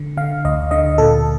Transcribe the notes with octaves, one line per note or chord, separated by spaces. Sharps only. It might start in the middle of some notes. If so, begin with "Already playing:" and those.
Already playing: D3
D3 F5
D2 D#5
D3 D#5
A#2 A4